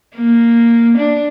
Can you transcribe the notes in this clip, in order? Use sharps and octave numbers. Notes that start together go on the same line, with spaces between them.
A#3
D4